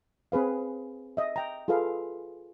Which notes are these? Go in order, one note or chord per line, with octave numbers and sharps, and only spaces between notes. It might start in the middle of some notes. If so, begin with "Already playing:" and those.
C4 G#4 B4 F5
D#5 E5
G5 A#5
F4 G#4 A4 B4 F5